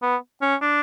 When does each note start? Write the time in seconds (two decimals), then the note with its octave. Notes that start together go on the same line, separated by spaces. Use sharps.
0.02 B3
0.42 C#4
0.62 D4